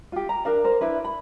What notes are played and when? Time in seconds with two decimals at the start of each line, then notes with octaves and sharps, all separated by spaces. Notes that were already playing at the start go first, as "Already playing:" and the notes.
0.12 F4 G4
0.29 A#5
0.45 D4 A#4 F5
0.64 A#4 C5
0.81 D4 E4 B4
1.04 B5